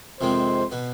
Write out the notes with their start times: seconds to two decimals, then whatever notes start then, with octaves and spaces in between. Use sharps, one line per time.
0.20 F2 C3 D#3 G#3 C4 C5
0.72 B2 B3